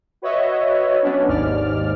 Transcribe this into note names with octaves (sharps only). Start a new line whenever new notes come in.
F#4 B4 C#5 D#5 E5
F#3 B3 C#4 D4
G#1 D#2 G#2 D5 F6